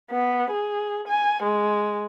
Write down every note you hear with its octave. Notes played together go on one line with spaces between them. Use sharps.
B3
G#4
G#5
G#3